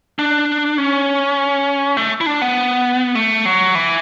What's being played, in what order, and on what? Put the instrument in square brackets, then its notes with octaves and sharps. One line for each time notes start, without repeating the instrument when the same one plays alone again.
[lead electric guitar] D4
C#4
A3
E4
D4
B3
A3
F#3
E3